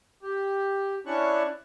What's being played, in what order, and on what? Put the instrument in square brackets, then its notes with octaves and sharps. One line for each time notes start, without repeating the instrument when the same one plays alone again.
[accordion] G4
C#4 D4 E4 C#6 F#6